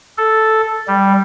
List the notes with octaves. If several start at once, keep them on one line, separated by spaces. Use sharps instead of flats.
A4
G3